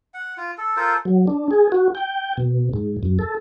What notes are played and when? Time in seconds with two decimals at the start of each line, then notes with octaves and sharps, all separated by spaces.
0.14 F#5
0.38 F4
0.58 A4
0.77 F4 A4 A#4 C5
1.05 F#3
1.27 D4
1.51 G#4
1.72 F#4
1.95 G5
2.37 B2
2.73 G#2
3.03 F#2
3.19 A4